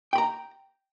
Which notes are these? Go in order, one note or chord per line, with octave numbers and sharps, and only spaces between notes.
G5 A#5 B5